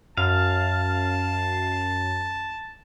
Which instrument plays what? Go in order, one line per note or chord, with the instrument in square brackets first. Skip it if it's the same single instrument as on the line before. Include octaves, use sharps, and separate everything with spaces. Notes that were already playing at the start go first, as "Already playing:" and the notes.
[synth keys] F#2 [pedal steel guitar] F5 [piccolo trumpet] A5